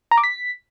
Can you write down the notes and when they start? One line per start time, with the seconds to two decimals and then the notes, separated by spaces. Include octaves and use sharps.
0.11 A#5
0.18 D6
0.24 B6